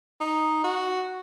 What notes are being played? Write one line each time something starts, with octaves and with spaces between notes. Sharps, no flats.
D#4
F#4